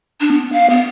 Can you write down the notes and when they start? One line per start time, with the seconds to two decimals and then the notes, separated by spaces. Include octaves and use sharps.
0.21 D4
0.32 B3
0.53 F5
0.70 B3